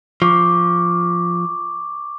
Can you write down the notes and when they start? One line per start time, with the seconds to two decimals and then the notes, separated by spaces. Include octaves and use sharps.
0.22 F3 C#6 D6